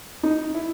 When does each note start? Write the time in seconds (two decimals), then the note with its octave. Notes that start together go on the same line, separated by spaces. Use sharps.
0.23 D#4
0.54 E4